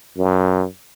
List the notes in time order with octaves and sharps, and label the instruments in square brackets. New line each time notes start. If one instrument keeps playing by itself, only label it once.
[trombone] F#2